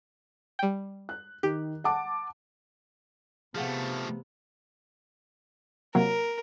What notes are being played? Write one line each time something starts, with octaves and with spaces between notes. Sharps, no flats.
G3 G5
F#6
D#3 G4
F#5 A5 D6
C3 F3 A3 B3 G#4 F5 F#5
C3 F#3 A#3 A#4